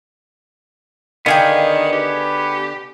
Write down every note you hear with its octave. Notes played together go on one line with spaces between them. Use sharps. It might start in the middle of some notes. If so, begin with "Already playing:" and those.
D3 D#3 B3 D4 G#4 F5 G5
G4 B4